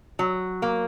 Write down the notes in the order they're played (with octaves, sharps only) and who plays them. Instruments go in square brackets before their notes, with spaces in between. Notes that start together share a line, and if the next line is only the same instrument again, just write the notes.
[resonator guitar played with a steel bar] F#3
A#3